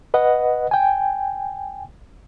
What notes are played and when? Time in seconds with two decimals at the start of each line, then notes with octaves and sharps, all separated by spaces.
0.14 B4 D#5 F#5
0.71 G5 G#5